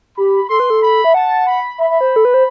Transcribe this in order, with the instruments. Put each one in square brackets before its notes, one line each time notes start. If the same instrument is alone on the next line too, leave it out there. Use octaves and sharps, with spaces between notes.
[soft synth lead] G4 [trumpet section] B5
[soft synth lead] A4 [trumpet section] C6
[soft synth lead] B4
A4
[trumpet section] B5
[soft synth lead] E5
[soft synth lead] F#5 [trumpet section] A5
[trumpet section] B5
[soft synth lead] E5 [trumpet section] B5
[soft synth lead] E5
C5
A4
B4
C5